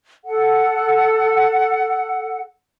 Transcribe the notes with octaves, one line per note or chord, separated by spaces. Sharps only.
A4 F#5